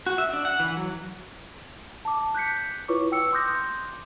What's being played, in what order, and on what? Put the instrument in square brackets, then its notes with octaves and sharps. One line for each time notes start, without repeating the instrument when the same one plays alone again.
[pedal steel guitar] F#4
E5
D4
F#5
E3
F#3
[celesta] A5 D6
F#6 G6 B6 C#7
E4 F4 B4 C#5 C#6 D6
G5 E6 C#7
C6 D6 D#6 F#6 G6 A#6